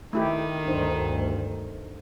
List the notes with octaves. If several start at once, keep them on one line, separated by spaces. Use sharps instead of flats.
D#3 A3 E4 G4
D2 G2 D4 D#4 C5